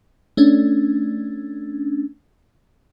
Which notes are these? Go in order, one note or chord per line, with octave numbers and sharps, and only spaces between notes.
A3 C#4 D4